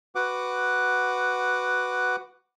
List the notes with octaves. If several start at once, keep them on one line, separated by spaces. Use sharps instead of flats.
F#4 B4 F#5 D6